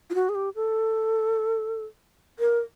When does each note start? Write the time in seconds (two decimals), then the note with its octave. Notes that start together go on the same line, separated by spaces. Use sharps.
0.10 F4
0.14 F#4
0.29 G#4
0.35 G4
0.55 A4
2.39 A#4